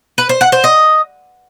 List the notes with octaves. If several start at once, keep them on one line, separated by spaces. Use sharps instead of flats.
B4
C5
F#5
C5
D#5